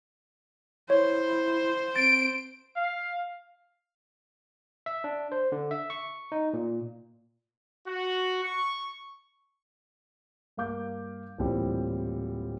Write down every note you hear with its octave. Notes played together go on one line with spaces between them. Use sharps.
E4 C5 C#5
C4 A6 D7
F5
E5
D4
C5
D3
E5
C#6
D#4
A#2
F#4
C#6
G2 A#3 F5 D6 G6
D1 A#2 E3 G3 C4